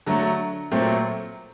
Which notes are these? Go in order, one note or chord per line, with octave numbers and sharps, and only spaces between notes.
D3 F#3 A3 A#5
A#2 F#3 A3 C4